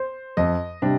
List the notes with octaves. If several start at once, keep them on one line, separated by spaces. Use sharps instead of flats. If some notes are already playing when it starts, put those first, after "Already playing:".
Already playing: C5
F2 D#5
C3 G3 D4